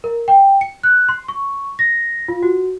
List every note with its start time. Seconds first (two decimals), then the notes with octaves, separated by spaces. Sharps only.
0.04 A#4
0.28 G5
0.61 C#7
0.83 F#6
1.09 C6
1.28 C#6
1.79 A#6
2.28 F4
2.43 F#4